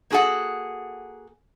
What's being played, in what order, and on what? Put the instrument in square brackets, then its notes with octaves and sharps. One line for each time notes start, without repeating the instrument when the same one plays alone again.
[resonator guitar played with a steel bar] A#3 F#4 G#4 A4 F#5